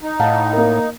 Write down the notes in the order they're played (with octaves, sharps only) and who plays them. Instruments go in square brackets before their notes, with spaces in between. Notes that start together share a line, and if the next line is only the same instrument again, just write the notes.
[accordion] D#4
[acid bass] A2 [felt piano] F5 F#5 A5
[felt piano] A#3 A#4